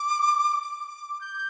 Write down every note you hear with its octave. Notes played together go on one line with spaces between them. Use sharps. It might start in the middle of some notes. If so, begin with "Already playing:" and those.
Already playing: D6
D6
G6